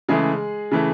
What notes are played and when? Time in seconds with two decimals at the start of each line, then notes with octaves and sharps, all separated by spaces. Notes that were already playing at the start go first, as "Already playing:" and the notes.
0.09 C#3 E3 G#3 A3 G#4
0.71 C#3 E3 A3